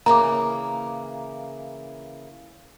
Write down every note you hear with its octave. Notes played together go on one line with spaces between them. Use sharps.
C#3 E3 A#3 A#5 D6